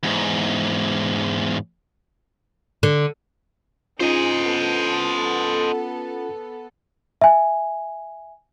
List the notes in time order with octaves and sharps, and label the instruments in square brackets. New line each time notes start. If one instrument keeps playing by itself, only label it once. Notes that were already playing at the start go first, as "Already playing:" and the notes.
[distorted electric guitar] E2 G#2
[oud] D3
[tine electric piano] C#4 F4 [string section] D#4 G#4 [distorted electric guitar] C5 D#5
[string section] B3 A4
[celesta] E5 G#5